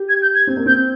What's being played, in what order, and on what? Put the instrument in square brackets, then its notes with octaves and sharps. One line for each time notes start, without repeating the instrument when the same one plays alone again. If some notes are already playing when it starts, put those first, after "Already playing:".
Already playing: [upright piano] G4
[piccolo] G#6
G6
G#6
[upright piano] C4
A#3
[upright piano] C4 [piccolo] G6